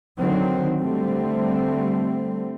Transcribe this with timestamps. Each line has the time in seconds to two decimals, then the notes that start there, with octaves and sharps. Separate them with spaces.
0.19 D3 D#3 F#3 C4
0.81 D3 G3 A3 C4